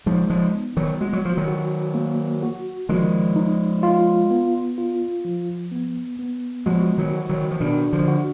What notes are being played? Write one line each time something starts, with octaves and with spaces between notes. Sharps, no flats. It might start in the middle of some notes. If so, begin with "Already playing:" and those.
F3 G#3 D#4
F3 G#3
B3
D#3 F#3
G#3 F#4
F#3
F3
D#3 F#3
F#4
A#3
F#4
D#3 F3 G#3
D#4
F4
B3
F4
F3
B3
B3
F3 G#3 F#4
D#3 F#3
F#4
D#3 F#3
F3
B2 D#3 D4
D3 F3
F#4